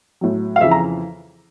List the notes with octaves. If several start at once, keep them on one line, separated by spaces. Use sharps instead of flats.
A2 F#3
F5
F2 C#3 E3 E5
A#5